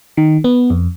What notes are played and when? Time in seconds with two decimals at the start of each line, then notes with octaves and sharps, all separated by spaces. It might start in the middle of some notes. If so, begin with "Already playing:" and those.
0.17 D#3
0.44 B3
0.70 F2